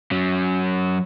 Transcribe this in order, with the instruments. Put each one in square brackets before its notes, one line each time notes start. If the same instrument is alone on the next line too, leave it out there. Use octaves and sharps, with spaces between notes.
[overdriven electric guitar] F#3 C#4